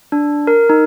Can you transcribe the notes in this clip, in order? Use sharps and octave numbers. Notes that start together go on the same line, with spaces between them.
D4
A#4
D#4